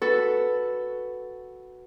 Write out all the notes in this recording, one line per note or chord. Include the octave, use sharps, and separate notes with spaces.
F#4 A4 B4